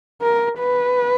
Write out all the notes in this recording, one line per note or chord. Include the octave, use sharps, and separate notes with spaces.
A#4
B4